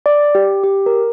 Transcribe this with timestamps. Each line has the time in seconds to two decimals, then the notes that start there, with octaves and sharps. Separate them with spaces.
0.06 D5
0.35 G4
0.63 G4
0.86 A#4